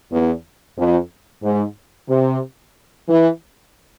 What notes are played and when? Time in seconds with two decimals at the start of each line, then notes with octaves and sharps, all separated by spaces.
0.12 E2
0.78 F2
1.43 G#2
2.09 C3
3.08 E3